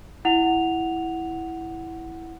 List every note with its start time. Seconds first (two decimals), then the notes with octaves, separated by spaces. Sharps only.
0.25 E4 F#5 F7